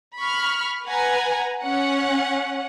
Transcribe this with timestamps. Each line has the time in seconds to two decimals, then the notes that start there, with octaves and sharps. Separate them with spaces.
0.19 B5 C#6 F6
0.85 B4 F#5 G#5 A#5
1.64 C#4 F#5